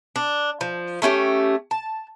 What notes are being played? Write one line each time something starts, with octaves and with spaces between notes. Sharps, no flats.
D4
F3
A3 C#4 D#4 G4
A5